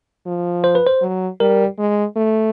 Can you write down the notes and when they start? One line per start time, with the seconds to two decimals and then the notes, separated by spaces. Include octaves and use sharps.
0.26 F3
0.64 C5
0.75 B4
0.87 C5
1.02 F#3
1.40 G3 A#4
1.79 G#3
2.16 A3